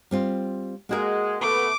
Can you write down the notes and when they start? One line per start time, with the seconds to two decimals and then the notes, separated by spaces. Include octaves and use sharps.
0.11 G3 C4 F4
0.89 G#3 A#3 F#4 A#4
1.41 A3 B3 D6